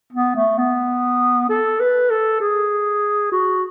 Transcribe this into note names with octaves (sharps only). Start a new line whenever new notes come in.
B3
A3
B3
A4
B4
A4
G#4
F#4